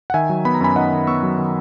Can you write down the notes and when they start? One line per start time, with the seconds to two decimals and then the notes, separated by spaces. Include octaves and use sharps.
0.10 F#5
0.14 D#3 E5 G#5
0.29 F#3
0.45 B3 B5
0.54 A#5
0.61 F#2 G#5 B5
0.76 D#3 D#5 F#5
0.92 D#3
1.07 B3 C#6 E6
1.23 F#3
1.38 D#3